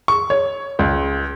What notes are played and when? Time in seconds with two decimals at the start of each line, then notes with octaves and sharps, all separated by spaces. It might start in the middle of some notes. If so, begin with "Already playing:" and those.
0.08 C#6
0.30 C#5
0.79 C#2